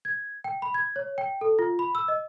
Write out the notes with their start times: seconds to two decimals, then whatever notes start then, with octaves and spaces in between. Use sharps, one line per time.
0.05 G#6
0.44 G5
0.62 B5
0.74 G#6
0.96 C#5
1.18 G5
1.41 A4
1.59 F4
1.79 B5
1.95 E6
2.08 D#5